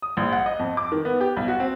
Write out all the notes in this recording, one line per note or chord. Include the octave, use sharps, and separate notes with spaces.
D#6
A#1
F#5
D#5
F2
D6
D#3
B3
G4
B1
F#4
C4